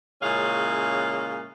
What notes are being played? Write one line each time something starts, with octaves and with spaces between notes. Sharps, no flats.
A#2 C#3 G#3 C#4 E4 F5